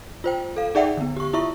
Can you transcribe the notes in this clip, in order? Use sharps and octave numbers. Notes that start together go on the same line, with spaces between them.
F4 C5 G5
A4 F5
D#4 G#4 D5 E5 F#5 G5
D3 B3
G4 C#6
E4 F4 E5 C#6